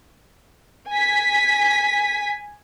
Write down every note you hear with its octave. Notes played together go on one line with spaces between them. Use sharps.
G#5 B6